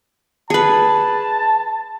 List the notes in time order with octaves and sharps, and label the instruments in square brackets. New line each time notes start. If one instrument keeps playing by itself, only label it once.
[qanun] G#4 B4 [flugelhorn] A5